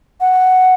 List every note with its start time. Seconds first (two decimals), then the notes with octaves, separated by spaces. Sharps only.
0.21 F#5